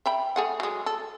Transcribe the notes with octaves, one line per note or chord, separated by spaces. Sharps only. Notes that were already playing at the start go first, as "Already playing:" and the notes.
E5 G5 B5
A3 G#4 F#5
F#3 G#3
A4